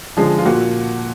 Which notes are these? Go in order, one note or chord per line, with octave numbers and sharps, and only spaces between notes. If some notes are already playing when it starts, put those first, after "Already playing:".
D3 F3 G#3
F4
A#2 F#4